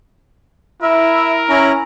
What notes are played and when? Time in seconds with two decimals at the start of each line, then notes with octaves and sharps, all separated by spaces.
0.82 E4 A#4 E5
1.49 C#4 E4 A#5